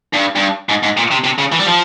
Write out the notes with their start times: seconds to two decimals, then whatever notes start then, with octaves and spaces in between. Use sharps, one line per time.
0.13 G2
0.36 G2
0.69 G#2
0.83 G#2
0.97 A#2
1.11 C3
1.24 C3
1.39 C#3
1.52 E3
1.59 G3
1.66 F3